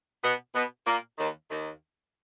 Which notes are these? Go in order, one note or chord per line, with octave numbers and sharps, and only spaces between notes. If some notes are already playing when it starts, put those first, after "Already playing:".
B2 B3
B2 B3
A#2 A#3
D#2 D#3
D#2 D#3